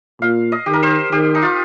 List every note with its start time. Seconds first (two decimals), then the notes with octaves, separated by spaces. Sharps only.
0.22 A#2 F5
0.52 D#5
0.66 D#3 G4
0.73 A#4
0.83 C5
1.12 D#3 G4
1.35 D#4
1.42 F4